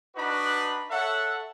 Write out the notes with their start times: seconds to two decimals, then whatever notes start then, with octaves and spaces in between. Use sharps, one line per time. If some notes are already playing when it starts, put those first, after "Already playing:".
0.16 D4 D#4 F#4 B4 B5
0.91 A4 C#5 E5 F#5